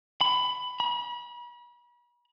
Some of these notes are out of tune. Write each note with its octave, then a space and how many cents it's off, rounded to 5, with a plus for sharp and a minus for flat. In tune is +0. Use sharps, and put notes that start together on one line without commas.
B5 +15
B5 -40